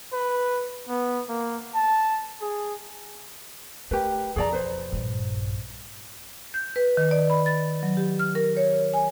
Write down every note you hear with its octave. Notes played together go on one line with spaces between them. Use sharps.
B4
B3
A#3
A5
G#4
A3 G4 A#4 B4
F2 B2 G#4 D5 A#5
B4 C5
A#1 G2
G6
B4
D#3
D5
B5
A6
F#3
G4
F6
A#4
C#5
G#5